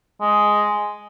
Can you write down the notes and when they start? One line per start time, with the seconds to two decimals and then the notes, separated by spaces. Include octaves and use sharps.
0.21 G#3